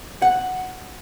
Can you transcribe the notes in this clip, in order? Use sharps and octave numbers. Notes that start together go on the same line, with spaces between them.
F#5